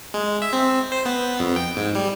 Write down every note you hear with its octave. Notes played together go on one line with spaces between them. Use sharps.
G#3
E5
C4
C5
B3
F2
G5
G#2
G3